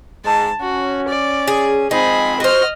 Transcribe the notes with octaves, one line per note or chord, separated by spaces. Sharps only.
G#2 G#3 A5
C#4 F#4
D5
G#4
F3 G#3 C4 D#4 G#4 B5
F#4 C5 D#5 F6